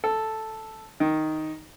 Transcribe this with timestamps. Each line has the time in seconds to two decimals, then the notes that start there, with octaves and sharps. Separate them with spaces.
0.04 A4
1.00 D#3